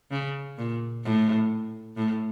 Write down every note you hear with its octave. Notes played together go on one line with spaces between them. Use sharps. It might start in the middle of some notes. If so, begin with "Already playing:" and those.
C#3
A#2
A2
A2